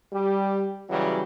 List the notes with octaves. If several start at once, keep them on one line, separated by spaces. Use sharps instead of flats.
G3 G4
C#3 E3 F#3 G3